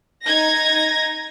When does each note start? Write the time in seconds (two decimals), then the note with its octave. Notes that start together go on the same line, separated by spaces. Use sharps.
0.24 D#4 G#6 A#6